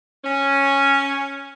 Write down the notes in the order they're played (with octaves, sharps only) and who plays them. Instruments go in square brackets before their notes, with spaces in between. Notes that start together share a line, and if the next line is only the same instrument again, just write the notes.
[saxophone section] C#4